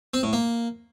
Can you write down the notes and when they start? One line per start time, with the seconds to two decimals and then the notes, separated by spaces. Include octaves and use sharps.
0.14 C4
0.23 A2
0.33 A#3